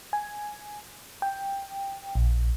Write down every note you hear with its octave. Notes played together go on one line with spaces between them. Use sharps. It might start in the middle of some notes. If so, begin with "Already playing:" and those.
G#5
G5
A#1